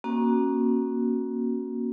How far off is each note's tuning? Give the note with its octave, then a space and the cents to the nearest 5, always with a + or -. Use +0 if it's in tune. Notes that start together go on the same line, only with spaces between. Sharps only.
A#3 +15 C#4 -25 F#4 +0